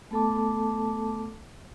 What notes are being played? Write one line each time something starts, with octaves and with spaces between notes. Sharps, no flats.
A3 B3 A4 A5 D6